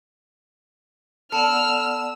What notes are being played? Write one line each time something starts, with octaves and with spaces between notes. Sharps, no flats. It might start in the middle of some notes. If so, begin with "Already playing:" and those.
B3 A4 D5 F#5 E6 F6